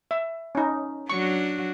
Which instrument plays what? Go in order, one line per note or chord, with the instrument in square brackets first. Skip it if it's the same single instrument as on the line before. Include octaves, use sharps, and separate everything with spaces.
[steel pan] E5
C#4 D#4
[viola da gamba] F#3 D4 F#4 [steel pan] C#6